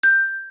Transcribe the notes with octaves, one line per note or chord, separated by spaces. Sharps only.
G6